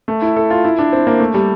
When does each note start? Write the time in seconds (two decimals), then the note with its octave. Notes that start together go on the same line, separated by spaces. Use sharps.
0.08 A3
0.22 E4
0.36 A4
0.50 F4
0.64 E4
0.79 D4
0.93 C4
1.07 A#3
1.20 A3
1.34 G3